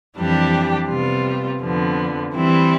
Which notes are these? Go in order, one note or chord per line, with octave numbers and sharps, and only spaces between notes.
F2 E3 G3 D4 G4
C3 G3 B3 F4
F2 D3 F3 B3
E3 G3 C4 E4